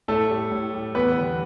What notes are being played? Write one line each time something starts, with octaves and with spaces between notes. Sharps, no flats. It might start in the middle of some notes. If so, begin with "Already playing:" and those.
A2 A3 A4
G3
A2
G3
E2 B3 B4
D3 G3